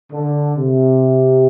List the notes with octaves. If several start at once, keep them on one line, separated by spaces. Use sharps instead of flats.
D3
C3